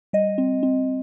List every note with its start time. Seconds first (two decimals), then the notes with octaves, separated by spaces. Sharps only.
0.13 G3 D#5
0.38 C4
0.63 C4